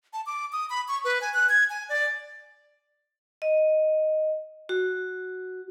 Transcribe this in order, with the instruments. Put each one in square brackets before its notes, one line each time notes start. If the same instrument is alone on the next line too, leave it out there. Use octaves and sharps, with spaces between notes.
[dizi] A5
D6
D#6
B5
C#6
B4
G#5
F#6
G#6
G#5
D5
[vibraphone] D#5
F#4